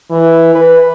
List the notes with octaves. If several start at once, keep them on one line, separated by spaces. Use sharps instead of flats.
E3
B4